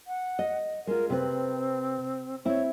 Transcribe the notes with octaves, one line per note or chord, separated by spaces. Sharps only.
F#5
D#5
G#3 F4 A#4
C3 C4 B4
C4 E4 C#5